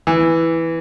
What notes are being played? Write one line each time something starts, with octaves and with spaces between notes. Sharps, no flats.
E3